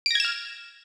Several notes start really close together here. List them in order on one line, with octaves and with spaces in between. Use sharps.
D7 A#6 G#6 E7 F6